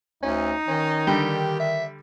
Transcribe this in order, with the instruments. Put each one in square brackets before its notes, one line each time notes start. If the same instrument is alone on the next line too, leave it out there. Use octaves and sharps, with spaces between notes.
[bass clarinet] D2 [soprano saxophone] C#4 [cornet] D#4
[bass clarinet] D#3 [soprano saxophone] C#4
[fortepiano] D3 G3 [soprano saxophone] G4
[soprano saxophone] E5